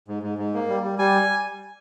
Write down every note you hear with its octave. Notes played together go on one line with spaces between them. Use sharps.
G#2
G#2
G#2
A#3
G3
G3
G3 G#5